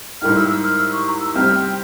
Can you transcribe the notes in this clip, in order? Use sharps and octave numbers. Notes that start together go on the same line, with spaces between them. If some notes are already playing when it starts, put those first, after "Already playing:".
G#2 G3 A#3 E4 G4 F6
E6
E6
F6
E6
C#6
A#5
E6
C3 G3 C4 G4 F6
G5